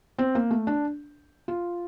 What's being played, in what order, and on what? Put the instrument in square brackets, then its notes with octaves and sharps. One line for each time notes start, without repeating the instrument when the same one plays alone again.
[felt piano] C4
A#3
A3
D4
F4